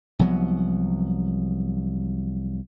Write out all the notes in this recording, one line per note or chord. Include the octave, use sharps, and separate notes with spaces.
C2 F3 F#3 B3